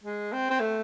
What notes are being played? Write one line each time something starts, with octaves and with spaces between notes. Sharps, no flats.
G#3
C4
C4
A3